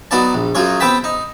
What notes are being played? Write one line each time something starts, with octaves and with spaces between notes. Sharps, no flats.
F#3 B3 D#4 D5 A5
A#1
F#2 F#3 F4 G#4 C#5
B3 C4 B4 G5 A5 B5
D#4